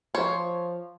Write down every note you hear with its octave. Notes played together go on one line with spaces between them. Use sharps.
F3 C5 C#5